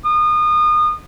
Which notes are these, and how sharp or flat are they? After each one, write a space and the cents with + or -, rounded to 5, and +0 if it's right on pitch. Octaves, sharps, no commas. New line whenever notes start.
D#6 -30